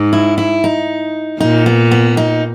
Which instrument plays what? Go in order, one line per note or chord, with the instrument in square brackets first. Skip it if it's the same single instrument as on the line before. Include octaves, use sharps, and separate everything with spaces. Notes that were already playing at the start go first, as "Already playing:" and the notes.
Already playing: [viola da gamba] G#2
[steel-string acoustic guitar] E4
E4
D#4
[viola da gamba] A#2 [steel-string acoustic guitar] D#4
[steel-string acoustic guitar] B3
B3
D#4